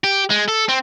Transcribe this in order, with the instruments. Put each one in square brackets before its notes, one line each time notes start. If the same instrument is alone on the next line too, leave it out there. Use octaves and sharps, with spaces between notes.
[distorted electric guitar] G4
G#3
A4
C4